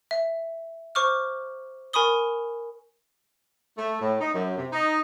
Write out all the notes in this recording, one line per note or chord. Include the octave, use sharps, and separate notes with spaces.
E5
C5 C#6 D6 F6
A#4 G#5 B5 C#6 D#6 G7
A3
A2
D#4
F#2
C3
D#4